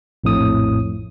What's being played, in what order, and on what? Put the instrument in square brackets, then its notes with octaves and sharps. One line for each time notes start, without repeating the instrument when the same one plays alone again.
[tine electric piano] A#1 F2 A2 D#6